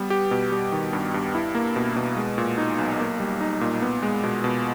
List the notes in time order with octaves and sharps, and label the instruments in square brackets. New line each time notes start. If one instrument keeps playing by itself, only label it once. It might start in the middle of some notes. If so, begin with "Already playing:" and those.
Already playing: [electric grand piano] G3 B3
G4
B2
G3
D#3
G2
G2
E4
A#3
B2
B2
G#3
A#2
D#4
B1
A#3
G3
D#4
A#2
B3
G#3
B2
B2